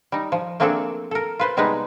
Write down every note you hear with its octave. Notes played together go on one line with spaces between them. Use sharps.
G3 D#4
F3
A3 A#3 C4 D4 G#4 A4
A4 A#4
F4 B4 C5
C3 G3 G#3 B3 D#4 B4